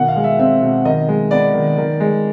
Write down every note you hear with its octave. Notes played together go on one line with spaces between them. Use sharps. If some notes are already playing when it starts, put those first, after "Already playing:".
Already playing: B2 D#3 F#5
F5
G#3
E5
C4 E5
B2
D#3 D#5
G#3
B3 D5
D#3
D#3
G#3